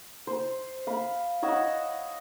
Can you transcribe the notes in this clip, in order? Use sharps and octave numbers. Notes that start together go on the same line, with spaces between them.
C5
F5 B5
C#5 D#5 F#5 E6